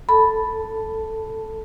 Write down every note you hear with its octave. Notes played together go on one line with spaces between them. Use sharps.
A4 A5 B5